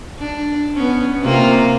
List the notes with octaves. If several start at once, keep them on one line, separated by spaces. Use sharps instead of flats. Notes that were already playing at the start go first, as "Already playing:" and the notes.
D4
B3 C#4
C3 A#3 F4